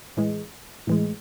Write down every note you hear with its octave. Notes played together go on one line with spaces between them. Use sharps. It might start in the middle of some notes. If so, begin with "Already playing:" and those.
A2 E3 G#3
A2 E3 G#3